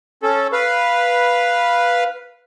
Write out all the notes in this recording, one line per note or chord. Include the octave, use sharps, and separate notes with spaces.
C#4 A4
B4 F5